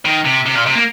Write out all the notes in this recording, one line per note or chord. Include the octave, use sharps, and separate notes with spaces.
D#3
C3
C3
A#2
C3
A#3